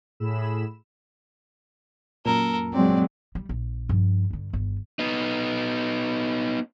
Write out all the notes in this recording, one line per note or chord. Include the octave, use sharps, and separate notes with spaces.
A2 G#4 B5 E6 E7
F#2 A#2 A4 A#4
F#3 G#3 C4 D5
G3
A#1
G2 F3
G2 D3
G1 D#3
B3 D#4